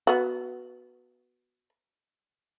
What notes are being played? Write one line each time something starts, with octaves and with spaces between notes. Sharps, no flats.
B3 F#4